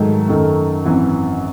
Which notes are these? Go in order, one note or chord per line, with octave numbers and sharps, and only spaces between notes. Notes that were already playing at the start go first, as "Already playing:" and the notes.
Already playing: G#2 D#3 F#3 A3
F#2 D#3 A3
G#1 F#2 E3